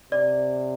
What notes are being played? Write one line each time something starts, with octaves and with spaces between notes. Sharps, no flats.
C3 D5